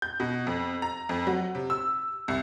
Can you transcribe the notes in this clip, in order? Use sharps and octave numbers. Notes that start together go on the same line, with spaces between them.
G6
B2
F2
A#5
F2
F#3
C3
E6
C2